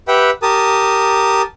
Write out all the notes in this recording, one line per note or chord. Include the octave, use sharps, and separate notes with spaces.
G4 B4 E5 F#5 G5
G4 A#4 A5 D#6